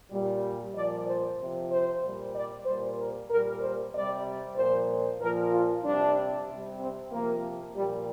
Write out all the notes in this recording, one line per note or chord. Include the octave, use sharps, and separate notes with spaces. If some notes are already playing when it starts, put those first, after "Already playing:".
A#2 G3
A#2 F3 D5
C5
C3 F3
C5
A#2 G3
D5
A#2 G3 C5
A#4
A#2 G3 A#4
C5
C3 G3 D5
A#2 F3 C5
A#2 F3 A#4
F4
C3 G3 D4
C3 G3
C4
C3 F3 A#3
A#2 F3 G3